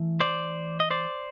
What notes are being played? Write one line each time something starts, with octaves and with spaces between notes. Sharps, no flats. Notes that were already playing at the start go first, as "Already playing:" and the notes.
Already playing: E3 A3
C5 D5
D#5
C5 D5